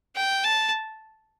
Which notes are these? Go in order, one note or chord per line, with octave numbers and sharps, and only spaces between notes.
G5
A5